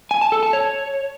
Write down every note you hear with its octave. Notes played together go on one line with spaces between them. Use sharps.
G#5
A5
A4
A5
C#5